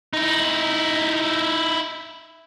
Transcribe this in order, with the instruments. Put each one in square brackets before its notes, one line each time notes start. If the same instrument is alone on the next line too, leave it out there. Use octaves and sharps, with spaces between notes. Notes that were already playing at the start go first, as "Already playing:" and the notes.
[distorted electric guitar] D#4 E4